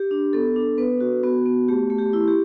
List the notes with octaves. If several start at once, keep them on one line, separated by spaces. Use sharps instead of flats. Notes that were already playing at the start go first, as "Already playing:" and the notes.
Already playing: G4
D4
B3 A4
D4
B3 B4
F#4
B3 F#4
B3
A3 G4
A3
G4
E4
G4